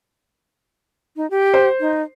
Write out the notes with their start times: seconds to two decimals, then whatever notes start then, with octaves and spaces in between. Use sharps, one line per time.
1.16 D#4
1.30 G4
1.54 C5
1.80 D#4